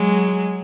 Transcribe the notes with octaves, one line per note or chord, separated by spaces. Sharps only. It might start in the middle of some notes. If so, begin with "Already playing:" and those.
Already playing: F#3 G#3